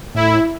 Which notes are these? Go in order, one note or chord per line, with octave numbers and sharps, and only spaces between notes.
A2 E4